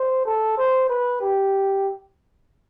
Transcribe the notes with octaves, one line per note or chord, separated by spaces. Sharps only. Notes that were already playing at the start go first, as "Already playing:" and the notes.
Already playing: C5
A4
C5
B4
G4